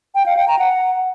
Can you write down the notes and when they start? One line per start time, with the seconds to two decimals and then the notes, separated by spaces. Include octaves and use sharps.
0.15 G5
0.26 F5
0.37 G5
0.48 A#5
0.59 F#5